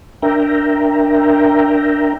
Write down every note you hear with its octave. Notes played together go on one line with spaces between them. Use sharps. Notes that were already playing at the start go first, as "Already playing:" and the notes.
D4 A#4 E5 G5 A#5